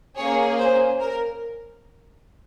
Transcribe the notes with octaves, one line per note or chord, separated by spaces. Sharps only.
A#3 C#4 G#4 C#5
C5
A#4